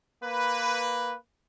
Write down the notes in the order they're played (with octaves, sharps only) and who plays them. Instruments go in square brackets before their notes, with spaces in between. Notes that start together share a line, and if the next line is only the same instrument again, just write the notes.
[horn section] A#3 B4